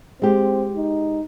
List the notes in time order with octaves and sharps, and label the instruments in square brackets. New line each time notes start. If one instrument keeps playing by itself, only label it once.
[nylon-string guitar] G#3 G4 [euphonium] C4
[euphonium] D#4